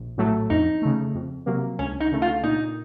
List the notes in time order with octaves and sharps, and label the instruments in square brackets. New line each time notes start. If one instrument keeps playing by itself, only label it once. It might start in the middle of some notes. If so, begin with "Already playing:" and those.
Already playing: [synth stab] A#1
A2 F#3 A3
[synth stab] F2 [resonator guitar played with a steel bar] D#4
[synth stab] C#3 A3
F2
C3 F#3 A#3
[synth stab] C#2 [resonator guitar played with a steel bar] C#4
[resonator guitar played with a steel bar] D#4
[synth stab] C#3 A3
[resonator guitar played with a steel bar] F4
[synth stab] A#2 [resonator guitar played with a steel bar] D#4